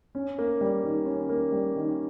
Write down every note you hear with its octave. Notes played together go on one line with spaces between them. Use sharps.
C#4
A#3
G3
D#3
C#4
A#3
G3
D#3